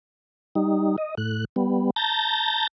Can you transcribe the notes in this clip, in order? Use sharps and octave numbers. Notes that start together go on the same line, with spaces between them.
G3 D#4
D#5
A2 F#6
G3 B3
A5 A#5 G6 A6 A#6